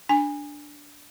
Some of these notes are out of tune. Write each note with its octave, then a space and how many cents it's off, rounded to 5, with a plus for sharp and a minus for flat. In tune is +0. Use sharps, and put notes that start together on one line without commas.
D4 +0 G#5 -20